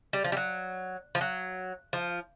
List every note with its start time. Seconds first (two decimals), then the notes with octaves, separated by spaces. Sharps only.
0.13 G3
0.25 F3
0.32 G3
0.37 F#3
1.15 F3
1.21 F#3
1.93 F3